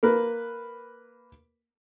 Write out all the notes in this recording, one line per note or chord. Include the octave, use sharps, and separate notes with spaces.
A#3 A#4 B4